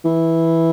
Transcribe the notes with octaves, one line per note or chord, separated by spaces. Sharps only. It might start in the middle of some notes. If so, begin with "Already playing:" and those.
E3